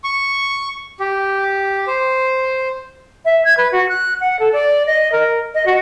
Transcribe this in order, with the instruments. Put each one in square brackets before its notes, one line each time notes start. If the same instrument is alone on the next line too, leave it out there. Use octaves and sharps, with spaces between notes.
[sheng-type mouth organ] C#6
G4
C5
[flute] E5
G#6
B4
F#4
F#6
F#5
A4
D5
D#5
A#4
D#5
F#4